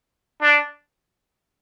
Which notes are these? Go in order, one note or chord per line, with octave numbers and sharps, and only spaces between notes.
D4